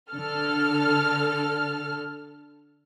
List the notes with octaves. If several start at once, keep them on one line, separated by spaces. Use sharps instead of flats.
D3 A4 F6